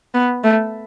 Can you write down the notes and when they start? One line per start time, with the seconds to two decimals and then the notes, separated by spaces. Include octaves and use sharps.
0.14 B3
0.44 A3